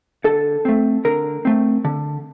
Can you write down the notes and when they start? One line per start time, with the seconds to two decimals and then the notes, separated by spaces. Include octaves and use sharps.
0.24 D3 A4
0.65 A3 C4
1.05 D3 A#4
1.45 A3 C4
1.85 D3